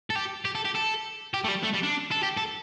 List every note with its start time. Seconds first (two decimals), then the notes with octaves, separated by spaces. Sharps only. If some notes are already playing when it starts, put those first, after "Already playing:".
0.10 A4
0.15 G4
0.45 G4
0.55 A4
0.65 G4
0.75 A4
1.34 G4
1.44 A3
1.48 G3
1.64 A3
1.74 G3
1.83 D4
2.12 A4
2.23 G4
2.37 A4